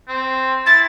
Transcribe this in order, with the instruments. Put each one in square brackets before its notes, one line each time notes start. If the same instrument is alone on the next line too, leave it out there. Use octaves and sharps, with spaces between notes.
[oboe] C4
[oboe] E4 [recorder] A6